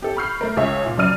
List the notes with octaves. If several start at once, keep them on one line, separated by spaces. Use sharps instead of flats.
G4 A4
B5 C#6 F6 G6 C7
A3 A#4
C#2 C#4 G#4 C#5 E5
A#2
F#2 C#3 D5 F6 D#7